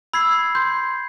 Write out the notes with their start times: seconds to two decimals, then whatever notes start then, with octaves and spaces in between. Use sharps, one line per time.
0.13 B5 E6 G#6 C7
0.55 C6 G6